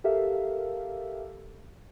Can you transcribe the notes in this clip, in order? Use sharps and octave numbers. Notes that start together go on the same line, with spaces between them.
G4 A4 A#4 E5 F5